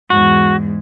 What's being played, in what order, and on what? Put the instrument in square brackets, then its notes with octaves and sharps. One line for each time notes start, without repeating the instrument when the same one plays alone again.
[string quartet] E2 G#2 [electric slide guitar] F#4